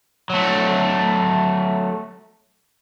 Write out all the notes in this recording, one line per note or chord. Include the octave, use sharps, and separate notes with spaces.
F#3 A3